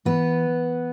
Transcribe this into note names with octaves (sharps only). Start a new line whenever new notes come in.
E3 B3 B4